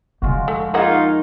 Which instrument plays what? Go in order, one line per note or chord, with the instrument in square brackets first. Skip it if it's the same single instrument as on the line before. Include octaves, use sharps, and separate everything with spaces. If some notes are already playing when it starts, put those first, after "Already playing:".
[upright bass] F2 D3 [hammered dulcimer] G#3 F4 F#4
[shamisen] A3
[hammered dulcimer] D#3 [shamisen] A#3 G#4 F#5 [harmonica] D#4 F4